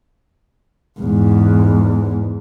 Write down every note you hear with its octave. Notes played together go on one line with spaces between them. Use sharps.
E2 G#2